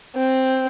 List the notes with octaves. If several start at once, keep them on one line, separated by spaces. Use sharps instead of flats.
C4